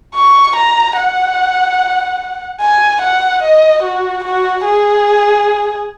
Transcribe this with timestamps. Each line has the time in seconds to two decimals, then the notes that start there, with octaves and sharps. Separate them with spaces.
0.15 C#6
0.56 A#5
0.97 F#5
2.61 G#5
3.02 F#5
3.43 D#5
3.83 F#4
4.24 F#4
4.65 G#4